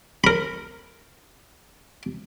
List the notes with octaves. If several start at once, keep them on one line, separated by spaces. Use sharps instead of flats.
A#4 B5